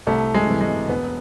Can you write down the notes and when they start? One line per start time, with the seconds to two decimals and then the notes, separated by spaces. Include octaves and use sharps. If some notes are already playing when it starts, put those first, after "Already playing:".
0.07 C2 A3
0.34 G#3
0.47 C3 E3
0.61 G#3
0.88 E1 B3